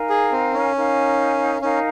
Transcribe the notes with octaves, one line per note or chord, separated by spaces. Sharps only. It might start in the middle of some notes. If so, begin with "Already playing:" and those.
Already playing: D#4 A#4 F5 G#5
G#4
C4
C#4
D#4 A#4 F5 G#5
C#4 D#4 A#4 F5 G#5